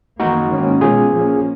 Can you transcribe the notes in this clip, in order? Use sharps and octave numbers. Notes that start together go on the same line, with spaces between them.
F#2 D#3 A#3 D#4 F#4
G#2 D#3 A#3 C#4
B2 G#3 C#4 F4 G#4
A#2 F3 A#3 C#4